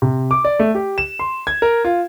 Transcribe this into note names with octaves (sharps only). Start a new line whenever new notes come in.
C3
D6
D5
A3
G4
E7
C6
G#6
A#4
F4